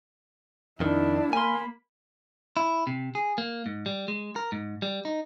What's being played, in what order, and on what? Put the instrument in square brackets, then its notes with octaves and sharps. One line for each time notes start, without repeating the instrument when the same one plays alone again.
[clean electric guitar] F2 D#3 [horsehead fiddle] D4 E4
[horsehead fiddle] A#3 B5 [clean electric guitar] G#5 C6
[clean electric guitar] E4
C3
G#4
A#3
G#2
G3
G#3
A#4
G#2
G3
D#4